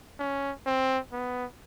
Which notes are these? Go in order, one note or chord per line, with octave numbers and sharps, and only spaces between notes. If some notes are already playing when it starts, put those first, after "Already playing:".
C#4
C4
B3